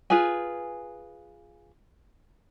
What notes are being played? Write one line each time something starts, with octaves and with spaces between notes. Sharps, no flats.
F4 G#4 B4 G#5